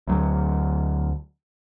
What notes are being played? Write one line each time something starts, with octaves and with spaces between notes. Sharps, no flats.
D2 F#3